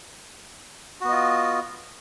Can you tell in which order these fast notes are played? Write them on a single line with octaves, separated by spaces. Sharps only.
F#4 B3 D#5 F4